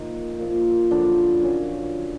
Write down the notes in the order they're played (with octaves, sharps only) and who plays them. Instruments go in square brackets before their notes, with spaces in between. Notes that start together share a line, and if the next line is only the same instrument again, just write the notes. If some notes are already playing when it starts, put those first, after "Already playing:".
Already playing: [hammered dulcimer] A#2 F3 D#4
A#2 F3
F#2 D3 F3 D4
F#2 D3 F3 C#4